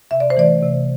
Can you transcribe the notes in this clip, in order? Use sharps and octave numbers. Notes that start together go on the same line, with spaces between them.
C3 E5
D5
C5
E3 A3 D5
C3